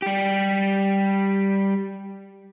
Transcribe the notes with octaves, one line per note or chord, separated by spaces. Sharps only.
G3 G4